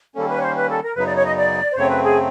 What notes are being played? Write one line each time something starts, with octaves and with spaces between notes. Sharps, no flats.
D#3 G3 A#3 C#4 A4
B4
C#5
C5
B4
A4
A#4
F#2 C#3 F#3 B3 D#4 B4
D5
C#5
D#5
D5
C5
F#2 C#3 F#3 A3 C4 C#5
B4
G#4